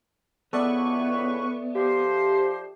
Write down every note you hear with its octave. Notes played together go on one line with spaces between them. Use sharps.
C#2 E3 B3 A4 B4 D5 E5 C#6
F3 G4 C5